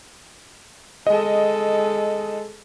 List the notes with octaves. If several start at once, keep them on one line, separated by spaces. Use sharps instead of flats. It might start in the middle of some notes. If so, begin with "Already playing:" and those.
G#3 A4 D#5